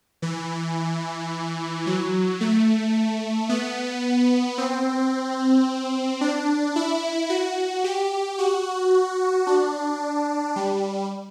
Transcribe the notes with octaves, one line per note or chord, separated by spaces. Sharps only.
E3
F#3
A3
B3
C4
D4
E4
F#4
G4
F#4
D4
G3